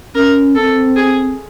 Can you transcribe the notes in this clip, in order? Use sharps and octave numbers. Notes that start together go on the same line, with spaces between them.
C#4 A#4
C4 A4
G#4